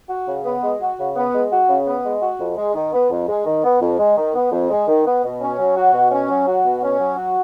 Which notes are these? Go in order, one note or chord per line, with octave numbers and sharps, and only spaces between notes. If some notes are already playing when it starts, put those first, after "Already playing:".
F#4
C#3
B3
G#3
F#4
C#3
B3
G#3
F#4
C#3
B3
G#3
F#4
F2
G#3
D#3
B3
F2
G#3
D#3
B3
F2
G#3
D#3
B3
F2
G#3
D#3
B3
B2
C#4
F#3
F#4
B2
C#4
F#3
F#4
B2
C#4
F#3
F#4